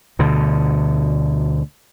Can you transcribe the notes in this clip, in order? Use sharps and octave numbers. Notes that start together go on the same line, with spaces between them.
D2 B2 D3